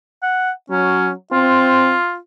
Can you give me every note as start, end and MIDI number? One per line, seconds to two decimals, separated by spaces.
0.23 0.51 78
0.70 1.13 54
0.70 1.09 61
1.32 1.96 60
1.32 2.17 65